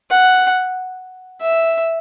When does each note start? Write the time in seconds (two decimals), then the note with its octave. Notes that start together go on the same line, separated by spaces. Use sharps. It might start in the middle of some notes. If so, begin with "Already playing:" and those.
0.10 F#5
1.41 E5